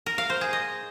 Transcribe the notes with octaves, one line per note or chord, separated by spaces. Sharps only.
A#4
F5
C5
G#4
D#5